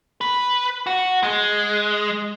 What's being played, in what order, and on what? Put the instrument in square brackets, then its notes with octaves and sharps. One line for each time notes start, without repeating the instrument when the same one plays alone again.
[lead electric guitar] B4
F#4
G#3